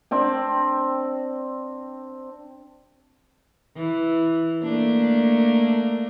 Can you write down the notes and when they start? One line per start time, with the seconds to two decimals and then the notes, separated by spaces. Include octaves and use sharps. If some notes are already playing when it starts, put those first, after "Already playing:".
0.11 C4 D4 G5
3.76 E3
4.63 A3 A#3 D4